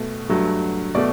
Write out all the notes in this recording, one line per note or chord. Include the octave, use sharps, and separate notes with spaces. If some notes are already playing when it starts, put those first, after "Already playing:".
Already playing: B2 A3
G2 F#3 A3
B2 A3 D5